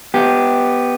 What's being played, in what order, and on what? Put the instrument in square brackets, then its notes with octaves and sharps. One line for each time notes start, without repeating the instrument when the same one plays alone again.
[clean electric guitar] B3 G4